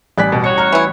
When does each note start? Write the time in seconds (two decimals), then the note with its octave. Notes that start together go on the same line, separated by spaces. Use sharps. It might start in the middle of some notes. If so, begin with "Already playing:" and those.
0.18 A1 G3 D5 G#5 F#6 B6
0.32 B2
0.44 F#4 C#5 C#7
0.58 A#5 F6
0.72 E3 E4